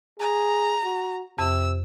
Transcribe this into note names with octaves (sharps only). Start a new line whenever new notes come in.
G#4 A#5
F#4
F2 C3 E6